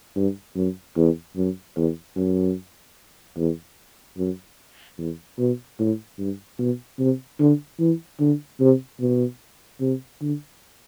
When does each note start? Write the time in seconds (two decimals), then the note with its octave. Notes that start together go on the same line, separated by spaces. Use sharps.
0.16 G2
0.56 F#2
0.96 E2
1.37 F#2
1.77 E2
2.17 F#2
3.37 E2
4.18 F#2
4.98 E2
5.39 B2
5.79 A2
6.19 G2
6.59 B2
6.99 C3
7.40 D3
7.80 E3
8.20 D3
8.60 C3
9.00 B2
9.81 C3
10.21 D3